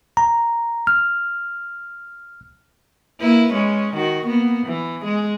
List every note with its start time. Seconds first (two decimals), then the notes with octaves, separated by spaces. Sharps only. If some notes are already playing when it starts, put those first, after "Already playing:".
0.17 A#5
0.87 F6
3.21 A#3 E4 B4
3.53 G#3 C#4
3.94 D#3 F#4
4.25 A#3 B3
4.66 E3
5.02 G#3 G#4